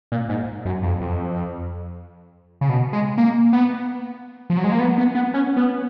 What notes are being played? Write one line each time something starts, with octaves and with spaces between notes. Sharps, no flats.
A#2
G#2
F#2
F2
F2
C#3
B2
G#3
A#3
B3
F3
F#3
G#3
A#3
B3
B3
B3
C#4
B3